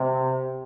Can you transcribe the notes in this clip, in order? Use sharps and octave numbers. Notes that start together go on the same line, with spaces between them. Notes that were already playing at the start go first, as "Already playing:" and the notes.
Already playing: C3